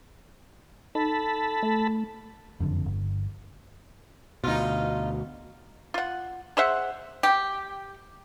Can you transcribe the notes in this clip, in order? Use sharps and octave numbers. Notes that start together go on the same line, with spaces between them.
D#4 A4 A5 B5
A3
F#1 F2 D3
G1
D2 B2 D#4 F4
F4 F#5
G#4 C5 E5 F#5
G4